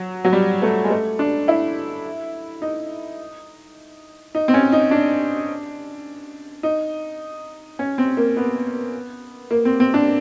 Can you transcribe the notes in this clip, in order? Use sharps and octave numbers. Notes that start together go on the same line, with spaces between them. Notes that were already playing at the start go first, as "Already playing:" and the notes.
Already playing: F#3
F#3
G3
A3
G#3
A3
D4
E4
D#4
D#4
C4
C#4
D#4
D4
D#4
C#4
C4
A#3
B3
A#3
C4
C4
D4